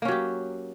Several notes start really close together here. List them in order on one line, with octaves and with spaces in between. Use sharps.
A#3 C#4 F#3 G4